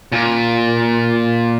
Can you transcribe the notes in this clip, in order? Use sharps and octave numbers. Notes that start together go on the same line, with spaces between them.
A#2